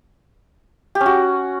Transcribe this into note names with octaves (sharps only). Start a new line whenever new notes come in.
G4
C#4
F#4